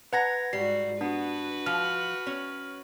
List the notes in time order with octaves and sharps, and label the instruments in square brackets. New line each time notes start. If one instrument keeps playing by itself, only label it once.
[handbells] B4 G#6 A#6 [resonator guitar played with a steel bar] F#5 A#5
[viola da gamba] G#2 F#4 [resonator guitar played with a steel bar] G3 [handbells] C7
[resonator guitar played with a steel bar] B3 [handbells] D4 [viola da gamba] F#4 B4
[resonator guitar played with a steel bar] F3 [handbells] F6
[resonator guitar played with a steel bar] C#4